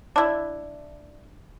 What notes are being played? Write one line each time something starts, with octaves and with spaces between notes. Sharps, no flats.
D4 E4